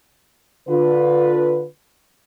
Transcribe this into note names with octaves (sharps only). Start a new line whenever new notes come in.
D3 F4 B4